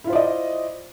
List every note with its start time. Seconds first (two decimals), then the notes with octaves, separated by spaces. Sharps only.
0.04 E4
0.07 F4
0.10 C5
0.13 D5
0.15 D#5